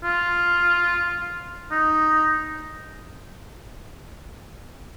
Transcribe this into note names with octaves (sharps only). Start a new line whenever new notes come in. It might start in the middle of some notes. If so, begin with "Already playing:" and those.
F4
D#4